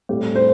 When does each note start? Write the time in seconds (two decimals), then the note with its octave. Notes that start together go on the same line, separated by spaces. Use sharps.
0.09 A2 G3 C4
0.35 C5